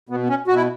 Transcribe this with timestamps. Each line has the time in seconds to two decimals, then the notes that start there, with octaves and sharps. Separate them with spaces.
0.09 B2 B3
0.23 B3
0.29 C#4
0.48 B2 F#4
0.55 E4